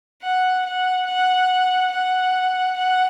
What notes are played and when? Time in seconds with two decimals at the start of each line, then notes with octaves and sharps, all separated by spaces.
0.23 F#5
0.66 F#5
1.08 F#5
1.93 F#5
2.78 F#5